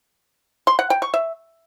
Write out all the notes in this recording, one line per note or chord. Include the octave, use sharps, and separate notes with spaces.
C6
F#5
G5
C#6
E5